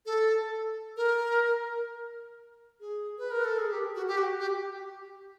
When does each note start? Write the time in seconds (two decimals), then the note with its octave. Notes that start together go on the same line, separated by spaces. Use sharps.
0.06 A4
0.97 A#4
2.80 G#4
3.18 B4
3.31 A#4
3.45 A4
3.59 G#4
3.72 G4
3.95 F#4
4.07 G4
4.18 F#4
4.40 G4